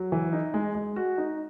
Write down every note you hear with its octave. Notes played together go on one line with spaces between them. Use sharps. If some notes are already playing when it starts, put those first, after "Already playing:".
Already playing: F#3
E3
D#4
G#3
G#3
F#4
D#4